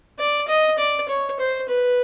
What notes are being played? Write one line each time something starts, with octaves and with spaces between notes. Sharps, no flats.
D5
D#5
D5
C#5
C5
B4